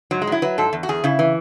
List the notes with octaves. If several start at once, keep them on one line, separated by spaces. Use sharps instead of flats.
G#2 F#3
G#3
F#3 E4
F#3 B4
G#2 A4
E2
F#4
E2 G#4
C#3 E4
E3